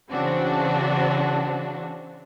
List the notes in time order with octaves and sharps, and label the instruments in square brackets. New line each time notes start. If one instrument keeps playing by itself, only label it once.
[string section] C#3 E3 C4 D4 F#4